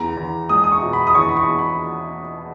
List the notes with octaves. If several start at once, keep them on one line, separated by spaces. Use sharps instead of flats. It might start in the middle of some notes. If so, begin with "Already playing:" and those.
Already playing: E2 A#5
E2
G#3 D#6
D#6
C#6
B2
B5
D#6
E2 C#6
B5
C#6
E2
B5